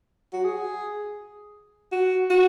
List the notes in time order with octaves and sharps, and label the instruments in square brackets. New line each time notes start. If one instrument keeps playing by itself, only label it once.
[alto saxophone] F#4
G#4
F#4
F#4